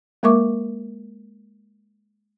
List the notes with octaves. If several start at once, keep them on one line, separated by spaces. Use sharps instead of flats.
G#3 A#3 A#4 E5 C#6 D6